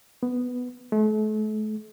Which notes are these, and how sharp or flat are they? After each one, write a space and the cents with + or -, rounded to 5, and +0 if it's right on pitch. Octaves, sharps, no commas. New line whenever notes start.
B3 +5
A3 -40